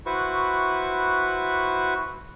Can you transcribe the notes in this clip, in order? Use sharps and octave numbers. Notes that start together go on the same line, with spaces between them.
E4 F#4 B4 C5 C#6